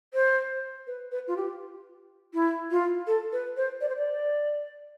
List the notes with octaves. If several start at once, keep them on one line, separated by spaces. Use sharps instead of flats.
C5
B4
B4
F4
G4
E4
F4
A4
B4
C5
D5
C5
D5